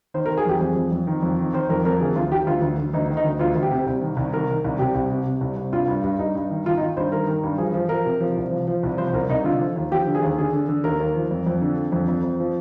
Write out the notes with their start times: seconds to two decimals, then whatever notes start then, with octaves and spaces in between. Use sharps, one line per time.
0.14 D#3 C5
0.26 A#4
0.29 D#3
0.38 G#4
0.46 F2 G4
0.61 F2 G#4
0.76 F2
0.92 F2
1.07 D#3
1.23 F2
1.39 D#3
1.53 D#3 C5
1.69 F2 A#4
1.85 F2 A#4
2.00 D2 G#4
2.16 D2 F4
2.31 D#3 G4
2.47 D2 F4
2.62 D2
2.78 D2
2.93 D2 D#4
3.09 D#3
3.17 D#4
3.24 D2
3.39 D2 F4
3.55 D2
3.63 G4
3.71 C3
3.86 C2
4.02 D#3
4.17 C2
4.33 D#3 A#4
4.49 D#3
4.64 C2
4.79 C2 G4
4.95 C2
5.10 C3
5.26 C3
5.41 C2
5.56 C2
5.72 G2 F4
5.88 G2
6.04 G2
6.19 G2 D#4
6.35 G2
6.50 D#3
6.66 D#3 F4
6.77 D#4
6.81 D#3 F4
6.96 G2 C5
7.12 D#3 A#4
7.27 D#3
7.43 G2
7.58 F3 G#4
7.74 F3
7.89 F3 A#4
8.05 C3
8.20 F3
8.36 C2
8.51 F3
8.67 F3
8.83 C2
8.98 F3 C5
9.13 C2 A#4
9.29 C2 D#4
9.44 D3 F4
9.60 F3
9.76 D#2
9.91 F3 G4
10.07 D3
10.15 G#4
10.22 D#2
10.38 D3 G#4
10.53 D3
10.69 D3
10.84 D#2 A#4
11.00 D#2
11.15 F3
11.31 F2
11.47 F2
11.62 D3
11.78 D3
11.92 F2
12.08 F2
12.23 F2
12.40 F3